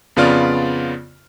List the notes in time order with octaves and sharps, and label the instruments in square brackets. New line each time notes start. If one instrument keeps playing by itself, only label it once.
[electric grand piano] F2 C#3 B3 F4 D5 F6